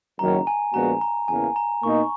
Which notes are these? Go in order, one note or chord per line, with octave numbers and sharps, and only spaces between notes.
F#1 F#2 D#3 F#3 C#4 A#5
G#5
A#1 A#2 G#3 B3 F#4 A#5
A#5
E2 C#3 E3 A#3 G#5
A#5
B2 A#3 D#4 C#6